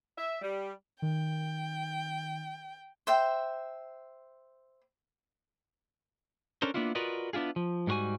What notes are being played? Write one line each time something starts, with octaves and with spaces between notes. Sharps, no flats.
E5
G3
D#3 G5
C5 E5 G5
C#4 D4 A4 A#4 C5
A#3 B3 D4 E4 F4
F4 F#4 A#4 B4 D5 D#5
B3 D4 E4 F4 G#4
F3
G#2 G3 A3 F#4 G#5